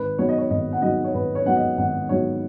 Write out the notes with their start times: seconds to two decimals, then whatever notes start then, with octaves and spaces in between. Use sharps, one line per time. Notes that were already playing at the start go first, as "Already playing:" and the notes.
Already playing: G#1 B4
0.18 G#2 F#3 B3 C#5
0.29 D#5
0.38 C#5
0.50 G#1 D#5
0.73 F#5
0.82 G#2 F#3 B3 D#5
1.04 C#5
1.14 G#1 B4
1.35 C#5
1.45 G#2 F#3 B3 F#5
1.56 D#5
1.78 G#1 F#5
2.09 G#2 F#3 B3 C#5